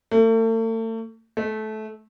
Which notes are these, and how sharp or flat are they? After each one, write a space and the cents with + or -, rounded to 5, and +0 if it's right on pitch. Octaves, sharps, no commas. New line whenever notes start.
A3 +40
A3 -20